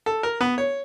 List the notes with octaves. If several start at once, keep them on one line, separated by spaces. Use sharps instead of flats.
A4
A#4
B3
C#5